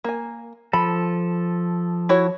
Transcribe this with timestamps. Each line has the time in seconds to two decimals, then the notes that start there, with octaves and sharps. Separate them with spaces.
0.04 A#3 G#5
0.73 F3 A4 B5
2.09 E4 F#4 C#5